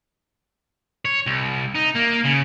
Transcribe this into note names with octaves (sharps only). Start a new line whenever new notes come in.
C#5
C2
D#4
A#3
C#3